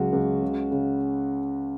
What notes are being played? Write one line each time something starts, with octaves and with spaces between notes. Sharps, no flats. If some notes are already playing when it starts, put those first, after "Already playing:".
Already playing: C#2 F#3 F#4
C#2
C#3
C#3